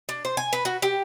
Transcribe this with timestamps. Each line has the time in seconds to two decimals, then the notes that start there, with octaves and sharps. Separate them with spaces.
0.09 D4
0.25 C5
0.37 G#5
0.53 B4
0.65 F#4
0.82 G4